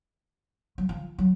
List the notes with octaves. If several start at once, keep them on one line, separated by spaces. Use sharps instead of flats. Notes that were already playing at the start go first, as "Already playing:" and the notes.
F#3
F3
F#3